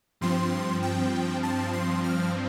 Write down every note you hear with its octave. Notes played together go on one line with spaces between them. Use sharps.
G2 F3 C4 C6
G5
A5
C6
F6